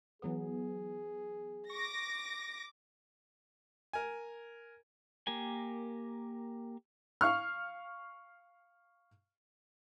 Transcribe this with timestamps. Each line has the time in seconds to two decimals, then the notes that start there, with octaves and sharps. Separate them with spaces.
0.22 E3 F#3 B3 G#4
1.70 C#6 D6 A#6
3.93 A#4 G#5
5.27 A#3 G4 A#4 G#5
7.21 F5 C#6 F6